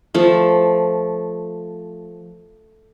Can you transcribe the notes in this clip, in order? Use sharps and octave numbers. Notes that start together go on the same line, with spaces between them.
F3 A3